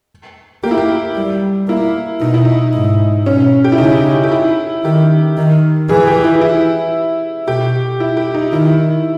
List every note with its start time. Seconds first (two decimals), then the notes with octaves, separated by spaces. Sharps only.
0.63 A#3 G4
0.71 E4
0.77 G4
1.16 G3
1.68 A#3 E4
2.21 B2 D#4
2.34 E4
2.45 D#4
2.73 G#2
3.26 B2 C#4
3.64 G4
3.72 E4
3.78 C#3 D#4
4.23 G4
4.32 E4
4.84 D#3 G4
5.37 D#3
5.89 E3 G#4
6.07 G4
6.24 E4
6.41 E4
7.47 B2 G4
8.00 E4
8.17 G4
8.34 D#4
8.52 D#3 E4